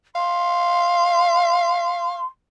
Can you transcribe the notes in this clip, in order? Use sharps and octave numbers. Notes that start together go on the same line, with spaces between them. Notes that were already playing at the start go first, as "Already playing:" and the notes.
F5 C6